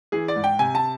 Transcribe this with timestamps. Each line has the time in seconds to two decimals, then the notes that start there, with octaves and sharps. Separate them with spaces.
0.12 E3 G#4
0.28 D5
0.36 G#2
0.44 G5
0.59 C3 G#5
0.75 A5